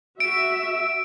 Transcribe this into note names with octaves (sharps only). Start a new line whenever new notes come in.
F#4 E5 D7